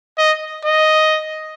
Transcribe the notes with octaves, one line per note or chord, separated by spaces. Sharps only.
D#5
D#5